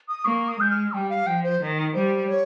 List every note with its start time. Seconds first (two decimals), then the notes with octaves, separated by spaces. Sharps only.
0.09 D#6
0.25 A#3 C#6
0.48 D#6
0.59 G#3 G6
0.71 F6
0.93 G3 G5
1.10 F5
1.26 F3 G5
1.43 C5
1.60 D#3
1.94 G3 C5
2.28 C#5